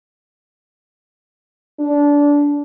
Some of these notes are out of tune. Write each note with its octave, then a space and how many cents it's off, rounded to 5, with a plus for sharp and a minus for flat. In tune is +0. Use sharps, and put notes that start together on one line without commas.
D4 -20